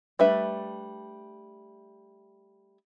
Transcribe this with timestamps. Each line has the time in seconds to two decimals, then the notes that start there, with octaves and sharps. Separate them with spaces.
0.19 G3 A3 D4 B4 E5